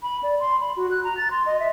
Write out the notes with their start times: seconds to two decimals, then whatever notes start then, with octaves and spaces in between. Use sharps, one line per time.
0.03 B5
0.23 D5
0.40 C6
0.60 B5
0.76 F#4
0.91 F#6
1.04 A#5
1.17 A6
1.31 C6
1.46 D#5
1.60 E5